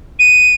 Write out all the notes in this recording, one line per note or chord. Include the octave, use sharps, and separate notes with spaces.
D#7